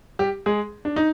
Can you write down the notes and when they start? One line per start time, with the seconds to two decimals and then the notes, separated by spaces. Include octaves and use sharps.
0.19 G3 G4
0.46 G#3 G#4
0.85 D4
0.96 D#4